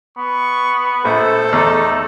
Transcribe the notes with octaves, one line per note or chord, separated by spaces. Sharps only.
B3 C#6
A#1 A3 A4 C5
E2 A3 D#4